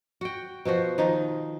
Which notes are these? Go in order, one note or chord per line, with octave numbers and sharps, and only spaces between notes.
F#4 G5
B2 F3 F#4 C5
D#3 F3 D#4